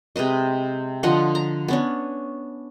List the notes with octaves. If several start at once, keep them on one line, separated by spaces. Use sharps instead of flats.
C3 G#3 B4 D#5
D3 F3 D#5 F#5
A#5
B3 C#4 D4